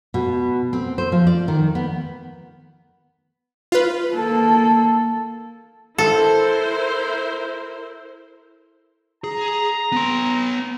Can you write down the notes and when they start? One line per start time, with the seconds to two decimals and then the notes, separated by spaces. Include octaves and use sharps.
0.14 B2
0.73 C4
0.98 C5
1.12 F3
1.27 D5
1.48 D#3
1.75 B3
3.72 F4 B4
4.13 A#3 A4
5.98 E4 A4 A#4 C5
9.24 G#4 A#5
9.92 B3 C6